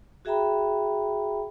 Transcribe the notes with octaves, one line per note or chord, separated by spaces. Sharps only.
F#4 G#4 E5 G5 A#5 B5